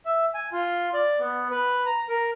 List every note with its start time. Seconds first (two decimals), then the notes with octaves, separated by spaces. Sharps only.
0.05 E5
0.34 G#5
0.52 F4
0.93 D5
1.19 B3
1.51 B4
1.86 A#5
2.09 A#4